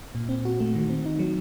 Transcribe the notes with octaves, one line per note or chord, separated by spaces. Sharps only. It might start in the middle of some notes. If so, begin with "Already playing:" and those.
A#2
C4
F#4
A3
D#3
C4
D#4
F#3